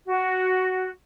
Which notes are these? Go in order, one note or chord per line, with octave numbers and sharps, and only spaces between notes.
F#4